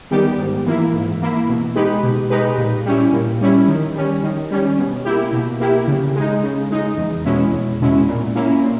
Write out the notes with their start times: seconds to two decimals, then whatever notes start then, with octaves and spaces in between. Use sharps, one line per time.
0.11 D#3 G3 B3 G4
0.38 G#2
0.66 E3 A#3 E4
0.94 G#2
1.21 E3 A#3 E4
1.48 B2
1.76 G#3 D#4 G4 B4
2.03 B2
2.30 G#3 D#4 G4 B4
2.58 A#2
2.86 G3 C#4 E4
3.13 A#2
3.41 G3 C#4 E4
3.68 D#3
3.96 G3 C#4
4.23 D#3
4.51 G3 C#4
4.78 B2
5.05 A#3 E4 G4
5.33 B2
5.60 A#3 E4 G4
5.88 C#3
6.15 G#3 D#4
6.43 C#3
6.71 G#3 D#4
6.97 E2
7.25 B2 G#3 C#4 E4
7.52 E2
7.81 B2 G#3 C#4 E4
8.08 A#2
8.35 A#3 C#4 E4
8.63 A#2